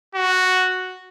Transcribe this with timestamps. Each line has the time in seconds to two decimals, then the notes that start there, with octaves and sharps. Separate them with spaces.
0.15 F#4